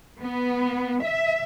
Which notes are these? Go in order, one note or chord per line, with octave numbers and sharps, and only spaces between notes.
B3
E5